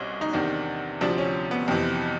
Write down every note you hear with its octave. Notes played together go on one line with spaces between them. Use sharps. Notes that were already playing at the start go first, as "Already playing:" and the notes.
Already playing: C2 B2 C#4
D#4
E2 C3 D#3 D4
D2 C3 F3 D4
C#4
B3
F2 C3 E3